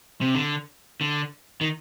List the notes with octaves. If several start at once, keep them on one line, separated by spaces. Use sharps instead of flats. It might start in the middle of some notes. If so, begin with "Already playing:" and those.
C3
D3
D3
D#3